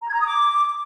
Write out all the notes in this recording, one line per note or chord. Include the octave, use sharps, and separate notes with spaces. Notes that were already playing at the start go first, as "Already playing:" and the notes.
A#5
G#6
A#5
D#6
D6